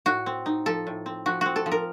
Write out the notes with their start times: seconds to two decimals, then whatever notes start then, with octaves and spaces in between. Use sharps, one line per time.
0.06 A2 F#4
0.26 C4
0.46 D#4
0.66 F3 A4
0.87 A2
1.06 C4
1.26 F3 F#4
1.41 C4 F#4
1.56 A4
1.66 F3
1.72 A#4